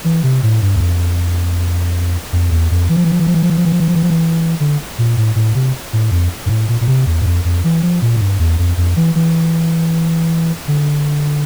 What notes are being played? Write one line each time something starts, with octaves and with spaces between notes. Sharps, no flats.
E3
C3
A2
G2
E2
F2
F2
E2
F2
E3
F3
E3
F3
E3
F3
E3
F3
E3
F3
E3
F3
E3
F3
E3
F3
E3
D3
A#2
A2
A2
C3
A2
F2
G2
A2
A#2
A#2
C3
E2
G2
F2
F2
E3
F3
A#2
A2
G2
E2
F2
F2
E3
E3
D3